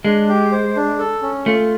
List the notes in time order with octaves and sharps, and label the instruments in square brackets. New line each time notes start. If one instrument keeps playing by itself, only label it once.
[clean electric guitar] G#3 [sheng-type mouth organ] D4
[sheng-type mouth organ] G4
C5
D4
A4
C#4
[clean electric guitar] A3 [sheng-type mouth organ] F4